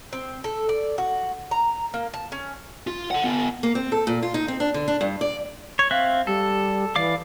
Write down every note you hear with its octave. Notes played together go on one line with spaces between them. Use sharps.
C4
A4
D5
F#4
A#5
A#3
A5
C#4
F4
A4 F#5
B3 F4
A#3
C4
A4
A#2
F4
D#4
C4
D4
D3
D4
G2
D5
C#5
C4 E5 F5 F#6
G3 A4
E3 D5 F5 D6